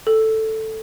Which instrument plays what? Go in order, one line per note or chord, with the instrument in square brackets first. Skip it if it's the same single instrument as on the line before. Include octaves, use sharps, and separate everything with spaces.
[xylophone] A4